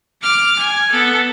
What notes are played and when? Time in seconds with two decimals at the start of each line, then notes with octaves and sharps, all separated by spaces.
0.22 D6 F6
0.59 G#5
0.91 B3 A4